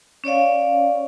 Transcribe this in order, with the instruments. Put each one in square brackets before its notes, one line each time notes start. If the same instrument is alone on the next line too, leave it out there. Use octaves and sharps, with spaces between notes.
[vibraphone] C#4 C#5 D5 F5